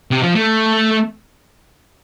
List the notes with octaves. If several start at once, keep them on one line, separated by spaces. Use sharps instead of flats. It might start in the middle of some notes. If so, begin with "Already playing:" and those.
C3
F3
A3